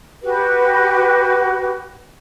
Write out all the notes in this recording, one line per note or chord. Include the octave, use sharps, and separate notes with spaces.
F#4 G4 B4